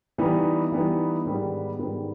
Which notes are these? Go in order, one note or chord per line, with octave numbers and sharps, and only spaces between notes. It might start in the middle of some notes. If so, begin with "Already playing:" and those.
E3 G3 B3 D#4
E3 G3 B3 D#4
G#2 D#3 G3 B3
G#2 D#3 G3 B3